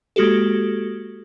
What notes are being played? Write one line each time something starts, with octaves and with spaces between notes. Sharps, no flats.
G#3 A#3 F#4 G4 A4